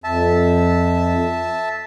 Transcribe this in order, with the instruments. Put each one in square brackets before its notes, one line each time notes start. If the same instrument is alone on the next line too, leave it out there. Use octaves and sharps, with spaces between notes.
[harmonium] F2 [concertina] E5 A5